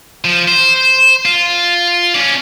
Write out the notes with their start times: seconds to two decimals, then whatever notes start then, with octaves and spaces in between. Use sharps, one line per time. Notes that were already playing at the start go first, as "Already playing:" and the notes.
0.25 F3
0.48 C5
1.25 F4
2.15 C#4 D5